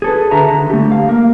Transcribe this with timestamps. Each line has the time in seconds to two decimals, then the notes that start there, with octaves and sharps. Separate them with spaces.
0.02 G#4 A4 B4
0.31 D3 F#4 E5 A#5
0.49 D3
0.70 A3 G4
0.92 F5
1.09 A#3 A#4